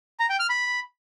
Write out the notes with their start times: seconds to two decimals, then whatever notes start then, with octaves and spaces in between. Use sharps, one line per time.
0.20 A#5
0.30 G5
0.39 F6
0.49 B5